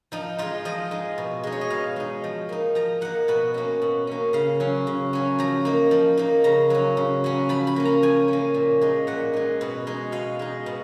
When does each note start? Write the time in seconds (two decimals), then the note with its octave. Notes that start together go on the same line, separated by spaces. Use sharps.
0.12 F3 D#4
0.38 G#3 D#4 F4
0.65 F3 D#5
0.91 G#3 D#4
1.18 B2
1.43 G#3 D#4
1.52 C#5
1.61 D#5
1.70 B2 F5
1.96 G#3 D#4
2.24 F3
2.49 A#3 D#4
2.75 F3 A#5
3.01 A#3 D#4 F#5
3.28 B2 F#5
3.54 A#3 C#4
3.82 B2
4.07 A#3 C#4
4.33 C#3 F5
4.60 F#3 C#4
4.87 C#3
5.13 F#3 C#4
5.39 F3 A#5
5.65 A#3 D#4
5.91 F3
6.17 A#3 D#4
6.44 C#3 A#5
6.70 F#3 C#4
6.97 C#3
7.24 F#3 C#4
7.49 F3 B5
7.67 B5
7.76 A#3 C#4
7.85 A#5
8.03 F3 G#5
8.28 A#3 C#4
8.54 A#2
8.81 G#3 D#4
9.07 A#2 F#5
9.33 G#3 D#4
9.61 B2
9.87 G#3 D#4
10.12 B2 F5
10.39 G#3 D#4
10.66 B2